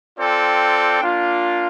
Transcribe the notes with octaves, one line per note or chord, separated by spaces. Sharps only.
C4 F4 A4 D5 G5
A#3 D4 F4